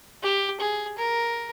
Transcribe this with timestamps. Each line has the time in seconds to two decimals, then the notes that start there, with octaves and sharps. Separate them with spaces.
0.23 G4
0.60 G#4
0.98 A#4